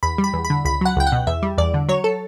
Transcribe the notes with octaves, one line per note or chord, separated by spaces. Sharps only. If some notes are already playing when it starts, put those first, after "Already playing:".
E2 B5
G3
B5
E2
B5
D3
C#2 B5
F#3 F#5
C#2 G5
F#5
B2
E2 E5
G3
E2 D5
D3
F#3 C#5
A4